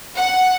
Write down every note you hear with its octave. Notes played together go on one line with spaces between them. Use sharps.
F#5